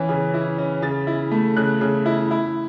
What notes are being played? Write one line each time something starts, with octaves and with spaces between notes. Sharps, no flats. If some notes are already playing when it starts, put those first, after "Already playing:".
Already playing: E3 C#4 E4
C#3
E4
C#4
C#3 A6
E4
A3
C#3 F#6
C#3
E4
E4